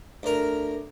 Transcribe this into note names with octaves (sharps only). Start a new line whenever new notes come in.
D2 A#4